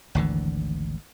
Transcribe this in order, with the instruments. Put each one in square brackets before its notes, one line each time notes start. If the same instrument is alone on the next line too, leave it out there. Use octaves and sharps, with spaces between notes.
[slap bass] G#1 D2 D3 E3